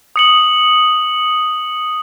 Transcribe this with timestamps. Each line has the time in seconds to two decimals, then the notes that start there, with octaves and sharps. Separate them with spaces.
0.16 D#6 C#7 F#7